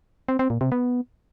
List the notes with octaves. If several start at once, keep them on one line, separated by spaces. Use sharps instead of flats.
C4
C4
A#2
C3
B3